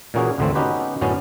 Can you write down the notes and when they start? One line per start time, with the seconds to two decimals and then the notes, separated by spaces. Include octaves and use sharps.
0.14 A#2 E3 A#3 C#4 F#4 G#4
0.38 G#1 D2 D3 E3 A3 C4
0.55 B3 C#4 D#4 F#4 G4 B4
1.01 F#2 A2 D3 B3 C#4